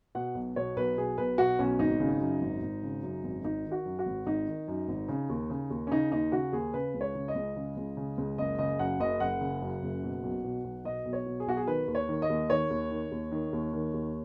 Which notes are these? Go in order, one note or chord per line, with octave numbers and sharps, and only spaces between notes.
B2 F#5
B1
B2 C#5
B1 B4
B2 G#4
B1 B4
B2 F#4
B1 C#4
G#1 D#4
C#3
F#2
G#1
G#1
C#3
F#2
G#1
G#1 D#4
D#3
F#4
F#2
F#4
G#1
G#1 D#4
D#3
F#2
G#1
C#3
D#2
C#3
D#2
C#4
C#3 D#4
D#2 D#4
C#3 F#4
D#2 G#4
C#3 B4
C#2
C#5
C#3
D#5
C#2
C#3
C#2
C#3
C#2
F#1 D#5
C#3 D#5
F#2 F#5
F#1 D#5
F#1 F#5
C#3
F#2
F#1
B2
B1
B2
B1
B2 D#5
B1
C#5
B2
G#4
B1 F#4
G#4
D#3 B4
D#2
C#5
D#3
D#5
D#2
D#3 C#5
D#2
D#3
D#2
D#3
D#2
D#3
D#2